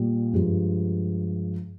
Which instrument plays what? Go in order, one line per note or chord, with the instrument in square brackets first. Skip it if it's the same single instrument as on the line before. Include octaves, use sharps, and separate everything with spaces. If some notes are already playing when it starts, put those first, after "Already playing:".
Already playing: [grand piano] A#2 G3
G2 F3 G#3